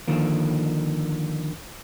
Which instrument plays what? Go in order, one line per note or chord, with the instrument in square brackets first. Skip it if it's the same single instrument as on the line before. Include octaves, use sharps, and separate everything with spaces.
[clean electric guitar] D3 D#3 F3 A#3